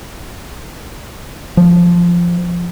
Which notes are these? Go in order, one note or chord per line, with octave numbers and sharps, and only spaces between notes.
F3